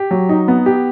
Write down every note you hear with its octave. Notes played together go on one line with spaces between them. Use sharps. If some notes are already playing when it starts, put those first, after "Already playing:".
Already playing: G4
F#3
D#4
B3
G4